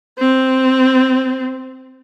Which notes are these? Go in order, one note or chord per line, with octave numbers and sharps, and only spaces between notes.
C4